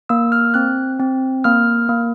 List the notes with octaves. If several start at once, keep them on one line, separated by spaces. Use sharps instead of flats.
A#3 E6
F6
C4 F#6
C4
A#3 F6
A#3